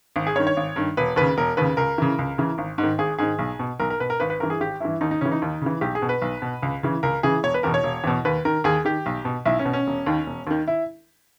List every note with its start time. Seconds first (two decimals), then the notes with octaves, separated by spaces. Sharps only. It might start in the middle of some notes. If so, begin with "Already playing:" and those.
0.16 G#1
0.27 G#4
0.36 G2 D#3 C#5
0.47 C#5
0.57 G#1
0.76 G2 D#3
0.97 E1 B4
1.16 D#2 C#3 B4
1.37 E1 A#4
1.57 D#2 C#3 B4
1.77 C#2 A#4
1.98 C#3 E3
2.19 C#2
2.38 C#3 E3
2.58 G#1
2.78 G#2
2.83 D#3
2.98 G#1 G#4
3.18 G#2 D#3 G#4
3.39 B1
3.59 B2
3.80 B1 A#4
3.90 A#4
4.00 B2 B4
4.10 A#4
4.20 G#1 B4
4.30 B4
4.40 G2 A#4
4.43 E3
4.50 G#4
4.60 G#1 G4
4.80 G2 E3 E4
5.01 D#2 D#4
5.11 D#4
5.21 C#3 E3 C#4
5.32 D#4
5.42 D#2
5.61 C#3 E3
5.81 B1 G4
5.95 G#4
6.02 B2
6.09 B4
6.22 B1
6.42 B2
6.63 C#2
6.83 C#3 E3
7.03 C#2 A#4
7.23 C#3 E3 G#4
7.43 E1 C#5
7.54 B4
7.63 E2 B2 A#4
7.74 C#5
7.83 E1
8.04 E2 B2
8.25 D#2 B4
8.45 D#3 A#4
8.64 D#2 G#4
8.85 D#3 G4
9.06 B1
9.25 B2
9.46 B1 E4
9.59 C#4
9.65 B2
9.73 C#4
9.87 E1
10.07 D#2 D#3
10.27 E1
10.47 D#2 D#3
10.68 E4